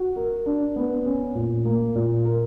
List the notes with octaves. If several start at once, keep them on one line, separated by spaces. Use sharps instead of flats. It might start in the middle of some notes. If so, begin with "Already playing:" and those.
Already playing: F#4
A#4
D4
B3
C#4
A#2
A#3
A#2
A#4